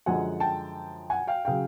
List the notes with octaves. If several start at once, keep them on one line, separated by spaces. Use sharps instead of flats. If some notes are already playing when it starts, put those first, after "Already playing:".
F#2 D3 F3 G#3 F#5 G#5
G5 A5
F#5 G#5
F5 G5
C#3 F#3 F5 G5